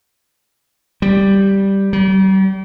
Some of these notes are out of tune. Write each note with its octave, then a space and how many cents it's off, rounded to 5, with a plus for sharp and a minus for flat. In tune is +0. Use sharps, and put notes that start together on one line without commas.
G3 +0
G3 -40